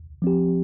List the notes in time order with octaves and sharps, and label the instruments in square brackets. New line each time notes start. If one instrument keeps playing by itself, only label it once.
[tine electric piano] F3 C4 G4